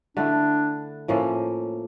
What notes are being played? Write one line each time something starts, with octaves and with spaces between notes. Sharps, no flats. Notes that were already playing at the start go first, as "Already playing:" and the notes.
D3 A3 D4 E4
A2 F3 A#3 C#4